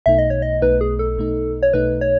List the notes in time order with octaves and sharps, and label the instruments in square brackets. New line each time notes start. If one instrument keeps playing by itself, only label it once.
[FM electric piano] B1 B2 A3 D#4 [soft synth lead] E5
[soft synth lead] D#5
C#5
D#5
[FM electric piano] B1 B2 A3 D#4 [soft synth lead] B4
[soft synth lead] G#4
A4
[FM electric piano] B1 B2 A3 D#4
[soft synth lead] C#5
[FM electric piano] B1 B2 A3 D#4 [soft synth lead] B4
[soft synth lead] C#5